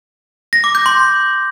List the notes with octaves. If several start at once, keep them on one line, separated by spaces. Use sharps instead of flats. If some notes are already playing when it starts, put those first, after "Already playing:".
A#6
D6
G6
C6